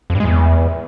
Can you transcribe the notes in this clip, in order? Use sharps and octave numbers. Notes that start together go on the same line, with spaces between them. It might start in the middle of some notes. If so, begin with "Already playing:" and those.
F2
G2
G#3
E2